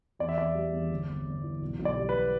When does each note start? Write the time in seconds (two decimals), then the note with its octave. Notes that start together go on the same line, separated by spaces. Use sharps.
0.19 E2 D5
0.29 E5
0.38 E2 D5
0.55 G3
0.73 E2
0.91 G1
1.09 G1
1.27 G1
1.44 E3
1.62 B1
1.79 B1
1.85 D5
1.96 G3
2.09 B4